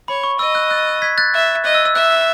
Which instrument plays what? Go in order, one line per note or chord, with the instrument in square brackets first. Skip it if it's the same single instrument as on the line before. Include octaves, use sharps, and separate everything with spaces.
[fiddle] C#5 [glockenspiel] B5
[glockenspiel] C#6
[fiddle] D#5 [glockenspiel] E6
[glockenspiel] F#6
F#6 A6
G#6 B6
F#6 A6
[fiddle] E5
[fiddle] D#5 [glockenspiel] F#6
[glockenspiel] E6
E6
[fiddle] E5 [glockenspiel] F#6